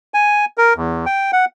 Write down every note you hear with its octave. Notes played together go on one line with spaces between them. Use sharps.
G#5
A#4
E2
G5
F#5